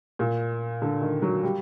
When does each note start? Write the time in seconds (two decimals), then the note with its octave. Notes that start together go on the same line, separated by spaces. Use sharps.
0.19 A#2
0.82 D3
1.02 D#3
1.22 F#3
1.43 G3